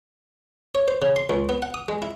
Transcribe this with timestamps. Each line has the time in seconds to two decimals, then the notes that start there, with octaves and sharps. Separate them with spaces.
0.75 C#5
0.88 C5
1.02 C#3
1.16 C6
1.30 C#2
1.49 B3
1.62 F#5
1.74 D#6
1.88 G#3
2.02 E4